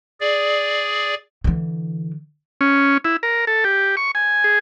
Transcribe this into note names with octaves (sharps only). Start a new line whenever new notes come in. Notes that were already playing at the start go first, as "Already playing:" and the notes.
G#4 D5
D3 E3
C#4
E4
A#4
A4
G4
C#6
G#5
G#4